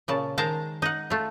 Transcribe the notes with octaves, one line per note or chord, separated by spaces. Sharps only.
A#2 C#3 A5
D#3 G#3 A#4 C5 A5 A#5
D#4 F#5
A3 F4